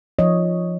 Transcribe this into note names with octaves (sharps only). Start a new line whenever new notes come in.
F3 C#5 D#5